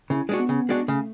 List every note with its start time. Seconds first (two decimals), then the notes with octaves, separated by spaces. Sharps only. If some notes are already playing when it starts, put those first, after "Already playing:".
0.10 C#3 E4
0.29 G#3 D4 F#4
0.39 B3
0.49 C#3
0.69 G#3 D4 F#4
0.88 C#3 A3